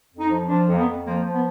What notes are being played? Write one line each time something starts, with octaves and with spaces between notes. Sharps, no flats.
F2
D#4
F3
F3 D4
F2
A#3
B3
F2
F3 A#3
F3
B3